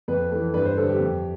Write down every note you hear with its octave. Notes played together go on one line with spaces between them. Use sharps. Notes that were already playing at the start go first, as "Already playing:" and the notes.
F2 B4
E3 A3
G2 B4
C5
D3 G3 A4
G4
F2